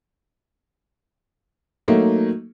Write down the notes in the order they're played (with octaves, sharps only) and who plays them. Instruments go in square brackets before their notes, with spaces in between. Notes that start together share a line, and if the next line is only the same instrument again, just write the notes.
[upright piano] F#3 A3 A#3 D#4